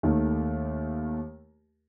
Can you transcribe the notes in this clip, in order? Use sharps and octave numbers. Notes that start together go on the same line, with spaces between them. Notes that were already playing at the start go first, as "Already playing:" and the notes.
D#2 D#3 A3